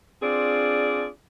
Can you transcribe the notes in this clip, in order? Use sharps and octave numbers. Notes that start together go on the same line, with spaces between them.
C4 D4 F4 G#4 D5